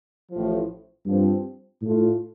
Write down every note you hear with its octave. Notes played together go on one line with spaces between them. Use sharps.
A1 A2 F3
G2 F3 C4
A2 A3 F4